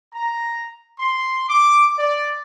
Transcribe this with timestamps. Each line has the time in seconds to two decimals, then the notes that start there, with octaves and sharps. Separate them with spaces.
0.13 A#5
0.99 C6
1.49 D6
1.97 D5